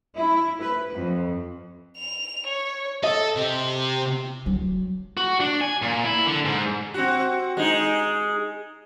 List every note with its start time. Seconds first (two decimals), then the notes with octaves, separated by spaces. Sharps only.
0.17 E4
0.60 B4
0.93 F2
1.96 F7
2.47 C#5
3.03 A4 D#5
3.36 C3
4.46 F#3
5.17 F#4
5.40 D4
5.61 G#5
5.82 A#2
6.04 E4
6.26 D3
6.45 G#2
6.94 C4 F#4
7.57 G#3 D#4